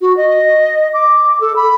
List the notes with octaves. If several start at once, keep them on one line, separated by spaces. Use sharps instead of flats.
F#4
D#5
D6
A4
B5